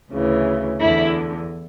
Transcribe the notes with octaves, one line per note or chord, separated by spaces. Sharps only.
D2 C#3 E3
E2 D3 E4